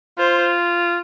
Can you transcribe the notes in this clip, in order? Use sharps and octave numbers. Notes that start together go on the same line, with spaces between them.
F4 C5